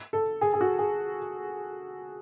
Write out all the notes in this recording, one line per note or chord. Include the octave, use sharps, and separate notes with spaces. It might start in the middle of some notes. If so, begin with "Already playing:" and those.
A4
G#4
G#4
F#4
G#4